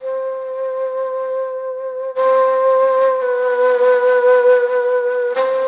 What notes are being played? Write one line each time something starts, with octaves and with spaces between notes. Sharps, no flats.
C5
C5
B4
C5